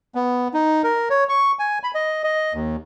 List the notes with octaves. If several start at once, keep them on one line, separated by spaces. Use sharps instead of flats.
B3
D#4
A#4
C#5
C#6
G#5
B5
D#5
D#5
D#2